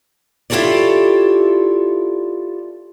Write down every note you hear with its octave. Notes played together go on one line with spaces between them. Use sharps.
E4 F4 G4 A4 C#5 D5